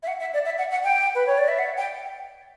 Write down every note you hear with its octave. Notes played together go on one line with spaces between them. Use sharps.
E5
F#5
E5
D5
E5
F#5
F#5
G5
B4
C#5
D5
E5
F#5
G5